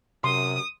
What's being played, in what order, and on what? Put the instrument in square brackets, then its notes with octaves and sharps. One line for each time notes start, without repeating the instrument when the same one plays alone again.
[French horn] F#2 [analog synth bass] C3 [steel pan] C6 [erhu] D#6